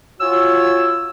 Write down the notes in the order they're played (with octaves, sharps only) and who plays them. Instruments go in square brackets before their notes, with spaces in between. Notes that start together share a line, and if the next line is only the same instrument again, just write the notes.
[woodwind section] F4 F#4 C#5 G#5 E6